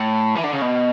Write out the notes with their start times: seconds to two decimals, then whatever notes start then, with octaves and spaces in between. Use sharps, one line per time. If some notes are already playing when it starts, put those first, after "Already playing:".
Already playing: A2
0.35 E3
0.43 D3
0.53 C#3
0.61 B2